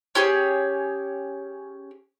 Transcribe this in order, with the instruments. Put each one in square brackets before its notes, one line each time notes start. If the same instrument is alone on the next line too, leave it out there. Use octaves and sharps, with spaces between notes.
[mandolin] C#4 G4 G#4 C#5